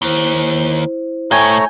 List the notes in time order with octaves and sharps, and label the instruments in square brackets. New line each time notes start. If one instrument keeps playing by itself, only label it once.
[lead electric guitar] D#2 [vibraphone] E4 C5
[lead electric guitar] A2 [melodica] A3 C#5 A#5 [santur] G5 G#5